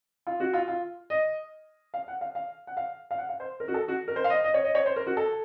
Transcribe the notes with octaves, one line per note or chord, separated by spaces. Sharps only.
F4
F#4
F4
F4
D#5
F5
F#5
F5
F5
F#5
F5
F5
F#5
F5
C5
A#4
F#4
A4
F#4
A#4
C5
F5
D#5
D#5
C#5
D#5
C#5
C5
A#4
F#4
A4